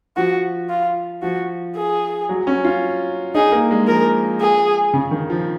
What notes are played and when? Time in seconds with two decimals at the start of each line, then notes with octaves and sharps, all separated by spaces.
0.16 F3 F#4
0.69 F4
1.22 F3 F#4
1.76 G#4
2.29 F#3
2.47 C#4
2.64 F4
3.35 D#4 G#4
3.52 A#3
3.71 G#3
3.87 F3 A#4
4.40 G#4
4.94 C#3
5.11 D#3
5.30 F3